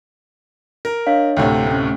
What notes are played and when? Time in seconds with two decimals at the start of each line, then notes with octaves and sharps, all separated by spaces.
0.85 A#4
1.07 D4 C#5 D#5 F5
1.37 D2 A2 C3 G5
1.67 A3 C#4